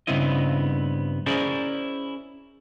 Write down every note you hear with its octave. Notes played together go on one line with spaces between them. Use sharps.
G2 C#3 B3 C4 E4 D#5
C#4 E4 G#4 A#4 C5 D5